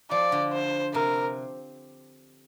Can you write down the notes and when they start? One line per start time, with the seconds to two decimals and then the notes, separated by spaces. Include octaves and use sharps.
0.11 F3 D5
0.32 D3
0.53 C5
0.94 C3 A#4